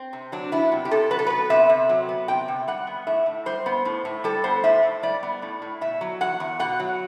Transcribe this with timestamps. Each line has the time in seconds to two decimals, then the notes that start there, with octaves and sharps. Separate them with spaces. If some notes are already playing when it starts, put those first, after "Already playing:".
Already playing: C4
0.13 C3
0.32 F#3 D4
0.52 B3 E4
0.72 C3
0.85 G4
0.91 C3 A4
1.11 F#3 B4
1.19 A4
1.27 B3 B4
1.50 C3 E5
1.69 C3
1.89 F#3
2.09 B3
2.28 C3 G5
2.48 C3
2.68 G3 F#5
2.87 B3
3.07 A2 E5
3.26 A2
3.46 G3 C5
3.66 B3
3.85 A2
4.05 A2
4.24 G3 A4
4.44 B3 C5
4.64 A2 E5
4.83 A2
5.03 G3 D5
5.23 B3
5.42 A2
5.62 A2
5.81 B2 E5
6.01 F#3
6.21 E2 F#5
6.40 E2
6.59 B2 F#5
6.79 F#3